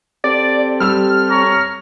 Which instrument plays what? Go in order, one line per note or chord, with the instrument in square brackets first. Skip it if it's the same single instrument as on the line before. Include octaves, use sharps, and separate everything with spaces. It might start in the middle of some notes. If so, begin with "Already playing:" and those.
[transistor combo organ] C4 G4 A4 [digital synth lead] D5
[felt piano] G3 E6 [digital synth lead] F6
[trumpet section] C#5 A#5 C#6